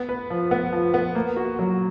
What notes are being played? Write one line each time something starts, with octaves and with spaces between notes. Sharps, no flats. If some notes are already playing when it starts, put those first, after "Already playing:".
Already playing: B3
B4
F3
B3
F3
B3
A#3
F#4
F#3